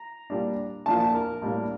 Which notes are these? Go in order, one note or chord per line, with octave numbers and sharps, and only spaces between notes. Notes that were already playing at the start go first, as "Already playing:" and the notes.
Already playing: A#5
A#2 G3 D4
A#2 F3 A#3 D4 A5
A5
A#4
A2 G3 A#3 D4